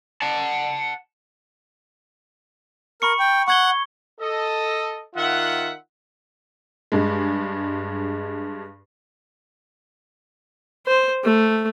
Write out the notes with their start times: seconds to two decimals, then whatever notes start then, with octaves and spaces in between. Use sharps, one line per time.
0.22 F#5 A5
3.02 A#4 B5 C#6 C#7
3.19 G5
3.48 F#5 C#6 G#6 G7
4.20 A4 D#5
5.15 D#3 F4 E5 F#5
6.92 G2 G#3
10.86 C5
11.24 A3